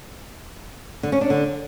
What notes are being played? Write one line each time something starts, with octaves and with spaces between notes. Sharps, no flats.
D3
C#4
D4
D3